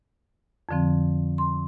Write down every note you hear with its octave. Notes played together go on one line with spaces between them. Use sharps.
F2 D3 F3 C4
C6